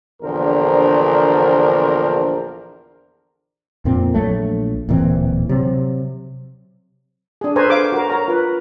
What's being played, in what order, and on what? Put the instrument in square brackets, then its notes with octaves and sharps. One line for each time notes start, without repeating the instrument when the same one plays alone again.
[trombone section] A#1 E2 D3 D4 A#4 C5
[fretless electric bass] F2 A#2 C4
A#1 F#3 A3
D1 A#2 E3 C4
C3 F#3
[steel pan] D4 G#4
A4 B4 C5 G#5 A#5 C#6
F5 D6
F#4 A#4
A#4 C#5 A#5
F4 B4